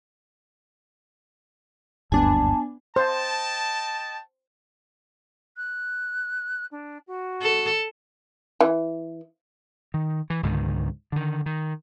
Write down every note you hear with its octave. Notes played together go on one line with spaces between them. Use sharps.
F#1 D2 G2 B3 D4 G#5 A5
C5 D#5 G5 A5
F#6
D4
F#4
A4
E3
D#3
E3
C#2 G#2 D3 D#3
D3 D#3
D#3